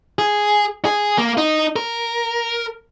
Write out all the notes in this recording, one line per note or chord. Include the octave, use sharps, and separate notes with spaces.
G#4
G#4
A#3
D#4
A#4